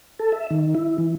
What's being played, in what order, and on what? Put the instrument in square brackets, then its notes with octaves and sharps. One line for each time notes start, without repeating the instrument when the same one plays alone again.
[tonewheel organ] A4
E5
D#3
E4
E3